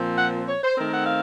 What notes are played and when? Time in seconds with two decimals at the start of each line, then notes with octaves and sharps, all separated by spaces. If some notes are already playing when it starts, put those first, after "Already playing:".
Already playing: A#2 F3 C4
0.18 F#5
0.49 C#5
0.63 C5
0.78 D#3 A3 C4 A#4
0.93 F#5
1.07 F5